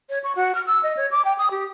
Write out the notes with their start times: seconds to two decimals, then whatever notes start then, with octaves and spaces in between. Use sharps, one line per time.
0.10 C#5
0.24 C#6
0.36 F#4
0.55 F6
0.67 E6
0.83 D#5
0.97 C#5
1.11 D6
1.25 G5
1.38 D#6
1.51 G4